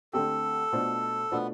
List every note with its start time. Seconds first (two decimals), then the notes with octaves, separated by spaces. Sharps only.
0.13 D3 A3 C4 G4 A4
0.73 B2 A3 D4 F4 C5
1.32 B2 A3 B3 D4 F4 C5